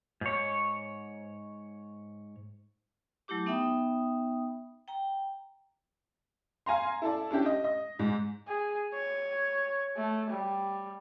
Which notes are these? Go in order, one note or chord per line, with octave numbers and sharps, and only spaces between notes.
G#2 C#5
F#3 A3 E4 G4 D6
B3 D#4 E5 G5 B5 D#6
G5 A#5
F5 G#5 A#5 C6
E4 A4 D5
C#4 D4 E4 G4
D#5
D#5
G#2
G#4
C#5
A3
G3